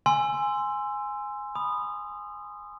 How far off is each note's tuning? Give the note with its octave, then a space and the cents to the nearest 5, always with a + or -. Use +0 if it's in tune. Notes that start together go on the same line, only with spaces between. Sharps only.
G#5 +0 C6 -5 E6 +15
B5 +0 D#6 -15